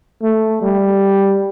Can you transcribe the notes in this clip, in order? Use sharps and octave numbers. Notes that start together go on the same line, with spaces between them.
A3
G3